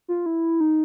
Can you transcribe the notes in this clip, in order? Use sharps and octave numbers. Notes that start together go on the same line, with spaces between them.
F4
E4
D#4